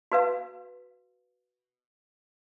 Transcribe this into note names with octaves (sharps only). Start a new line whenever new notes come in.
F#4 B4 F5